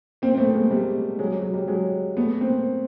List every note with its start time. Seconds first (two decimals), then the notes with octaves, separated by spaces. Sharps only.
0.22 A#3 C4
0.34 C4
0.38 A3 B3
0.54 G#3 A#3
0.71 G3 A3
1.19 F#3 G#3
1.40 F#3
1.54 G3
1.68 F#3 G#3
2.17 A3 B3
2.41 A#3 C4